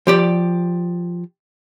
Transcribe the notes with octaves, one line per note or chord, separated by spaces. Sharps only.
F3 G4 D5